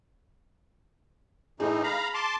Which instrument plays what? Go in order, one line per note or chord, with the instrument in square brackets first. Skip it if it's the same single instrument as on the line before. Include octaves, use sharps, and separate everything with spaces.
[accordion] A2 E3 D#4 [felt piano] G#4
[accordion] F5 A#5 B5
A5 C6 D6